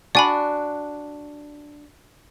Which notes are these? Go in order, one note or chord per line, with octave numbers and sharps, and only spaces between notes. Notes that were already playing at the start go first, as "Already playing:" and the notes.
D4 F#4 D5 G#5 B5